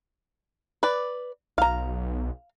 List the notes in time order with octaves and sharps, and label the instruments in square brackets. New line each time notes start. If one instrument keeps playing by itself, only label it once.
[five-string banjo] B4 D5
[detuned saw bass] B1 [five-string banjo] F5 A#5